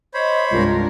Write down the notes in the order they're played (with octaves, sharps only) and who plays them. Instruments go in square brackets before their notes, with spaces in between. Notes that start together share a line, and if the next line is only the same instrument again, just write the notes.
[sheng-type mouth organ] C5 C#5 B5 [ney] D#5
[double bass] C2 G2 [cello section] G#3 D4 A#4 [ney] F4